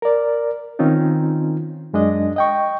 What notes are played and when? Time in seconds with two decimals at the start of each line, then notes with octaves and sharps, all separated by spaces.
0.02 A#4 D5
0.79 D#3 C4 C#4 D#4 F4
1.93 F#2 G#3 D4 D#5
2.36 D#5 G5 C#6